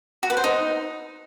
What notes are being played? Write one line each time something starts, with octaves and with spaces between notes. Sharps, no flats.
F#4
B4
C5
D#4